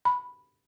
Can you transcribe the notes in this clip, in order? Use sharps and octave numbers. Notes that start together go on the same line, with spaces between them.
B5